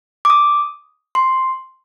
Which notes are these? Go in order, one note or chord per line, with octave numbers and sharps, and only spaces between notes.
D6
D#6
C6